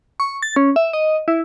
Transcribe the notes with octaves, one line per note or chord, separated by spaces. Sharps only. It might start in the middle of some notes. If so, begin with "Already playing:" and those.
C#6
A6
C#4
E5
D#5
E4